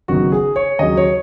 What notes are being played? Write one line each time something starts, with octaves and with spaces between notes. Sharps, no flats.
F#1 F#2 D#3 B3 D#4 F#4
G#4
C#5
D#2 C#3 F#3 D#5
C#5